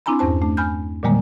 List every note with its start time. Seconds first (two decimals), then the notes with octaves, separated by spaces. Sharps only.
0.06 C4 D4 E4 G#5 A#5 B5
0.19 E2 G2 C#4 C5 A5
0.42 A3 D4
0.57 G#5 B5 F6 G6
1.03 A#2 D3 D#3 G3 G#3 A#3